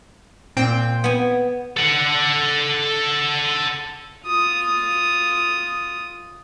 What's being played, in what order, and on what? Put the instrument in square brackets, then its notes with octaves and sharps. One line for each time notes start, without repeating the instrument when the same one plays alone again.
[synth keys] A#2 C4 G5
[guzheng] B3 G#5
[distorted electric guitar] A4 F#5
[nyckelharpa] F4 D#6